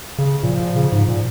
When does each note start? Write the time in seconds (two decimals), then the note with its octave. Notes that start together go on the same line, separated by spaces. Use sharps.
0.18 C#3
0.42 A#2 F3
0.59 A#2
0.76 C#3
0.92 G#2
1.08 A#2